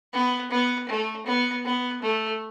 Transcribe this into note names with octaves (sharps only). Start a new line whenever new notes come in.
B3
B3
A3
B3
B3
A3